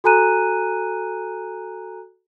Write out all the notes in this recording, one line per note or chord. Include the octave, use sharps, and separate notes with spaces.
F#4 A4 G#5 A#5 F#6 D#7